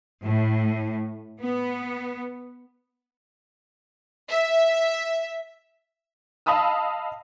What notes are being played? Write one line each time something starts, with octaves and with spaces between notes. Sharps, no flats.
A2
B3
E5
D#5 F5 A5 B5 D#6 E6